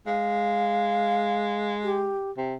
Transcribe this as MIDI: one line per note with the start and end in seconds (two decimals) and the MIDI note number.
0.06 2.18 56
0.06 1.73 77
1.84 2.31 67
2.37 2.55 48